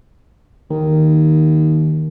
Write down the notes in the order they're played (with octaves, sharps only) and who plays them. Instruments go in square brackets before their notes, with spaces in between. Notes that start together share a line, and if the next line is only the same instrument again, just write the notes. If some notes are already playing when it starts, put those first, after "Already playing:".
[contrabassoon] D#2 [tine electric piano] D#3